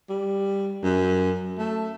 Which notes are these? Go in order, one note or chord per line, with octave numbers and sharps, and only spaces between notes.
G3
F#2
A3